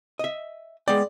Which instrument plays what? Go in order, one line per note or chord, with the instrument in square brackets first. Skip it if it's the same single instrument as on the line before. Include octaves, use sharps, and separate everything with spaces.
[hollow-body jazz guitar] D#5 E5
[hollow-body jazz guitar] G#3 B3 G5 [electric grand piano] D5